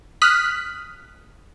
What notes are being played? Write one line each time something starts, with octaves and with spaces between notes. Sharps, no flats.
D#6 F6 F#6 B6